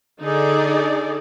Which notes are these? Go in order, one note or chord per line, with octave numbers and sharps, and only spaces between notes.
D3 D#4 G#4 A4 D5